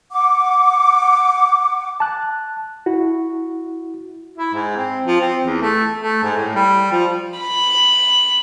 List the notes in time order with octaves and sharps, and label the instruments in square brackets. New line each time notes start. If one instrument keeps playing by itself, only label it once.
[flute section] F#5 D6
[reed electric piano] A5 F#6
E4 F#4
[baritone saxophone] E4
G#2
C4
F3
C4
E2
A3
A3
G#2
A2
G3
F3
[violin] B5